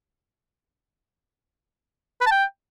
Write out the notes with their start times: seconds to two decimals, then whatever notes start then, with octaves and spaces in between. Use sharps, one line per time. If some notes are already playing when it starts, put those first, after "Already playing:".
2.21 B4
2.26 A5
2.31 G5